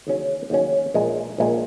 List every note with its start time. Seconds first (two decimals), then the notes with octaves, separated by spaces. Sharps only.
0.07 D#2 C#3 F#3 C#4
0.50 D#2 C#3 F#3 C#4
0.94 A#1 A#2 G#3
1.38 A#1 A#2 G#3